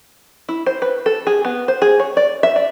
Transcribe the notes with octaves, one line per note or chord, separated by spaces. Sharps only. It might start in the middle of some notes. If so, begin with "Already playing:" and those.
E4
C5
B4
A4
G#4
B3
C5
G#4
C#5
D5
E5
D5